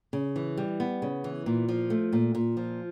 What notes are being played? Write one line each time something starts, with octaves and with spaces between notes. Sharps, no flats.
C#3
E3
G3
B3
C#3
E3
A#2
F3
A3
A#2
A#2
F3